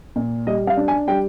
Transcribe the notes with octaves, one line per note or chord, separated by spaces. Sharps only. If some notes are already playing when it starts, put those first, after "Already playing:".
A#2
G3 D#5
F5
D4
G#5
G3 G5